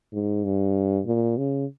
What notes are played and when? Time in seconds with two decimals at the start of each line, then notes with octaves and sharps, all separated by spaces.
0.13 G#2
0.45 G2
1.06 A#2
1.38 C#3